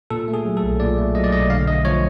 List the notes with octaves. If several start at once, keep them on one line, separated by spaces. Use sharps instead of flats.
A#2 A4
A3
G#4
F#3
A4
B1
A#2 D5
A3
F#3 D#5
D5
B1 D#5
D3 F5
A3 D#5
F3 C#5